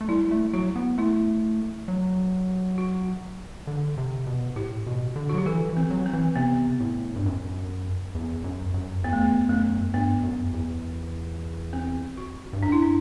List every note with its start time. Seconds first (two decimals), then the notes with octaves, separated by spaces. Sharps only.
0.01 A3
0.08 G3 E4
0.31 A3
0.53 F#3 F#4
0.76 B3
0.98 A3 E4
1.88 F#3
2.78 F#4
3.67 D3
3.97 C3
4.27 B2
4.56 A2 G4
4.87 B2
5.16 D3
5.29 F#4
5.34 F#3 G4
5.46 E3 A4
5.69 E3
5.77 C4
5.90 F#3
6.06 C4
6.13 E3
6.36 C3 B3
6.80 A2
7.16 G2
7.26 F#2
8.15 E2
8.44 F#2
8.74 F#2
9.04 E2 B3
9.13 A3
9.21 B3
9.49 F#2 A3
9.94 G2 B3
10.23 F#2
10.53 E2
11.73 C4
12.17 F#4
12.53 G2
12.63 F#2 D4
12.72 E4
12.82 D4